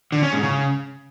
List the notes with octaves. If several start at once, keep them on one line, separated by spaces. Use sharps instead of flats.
D3
C#4
G#2
C#3